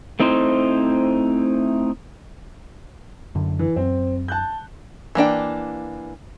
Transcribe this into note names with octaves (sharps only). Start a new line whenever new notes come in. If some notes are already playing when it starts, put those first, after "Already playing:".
A3 C4 D#4 E4 C5
F#2 D3
E3
F#2 C4
A5 F#6 G6
E3 A#3 D4 G5